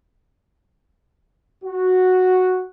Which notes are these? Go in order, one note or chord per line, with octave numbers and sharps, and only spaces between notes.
F#4